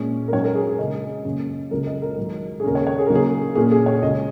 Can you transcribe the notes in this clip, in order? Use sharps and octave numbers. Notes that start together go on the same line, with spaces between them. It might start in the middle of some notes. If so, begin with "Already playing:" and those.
Already playing: A#2 G#3 C#4
A#4
G#2 F#3 C#4 C#5
A#4
G#4
G#4
C#3 G#3 C#4 D#5
F#2 C#3 A#3 C#4
C#2 C#3 F#3 A#4
D#5
A#4
G#2 D#3 F#3
G#4
D#2 C#3 A#3 C#4 A#4
C#5
C#5
G#4
C#3 F#3 A#3 D#4 A#4
G#4
A#2 A#3 C#4 G#4
G#4
C#5
C#2 C#3 G#3 D#5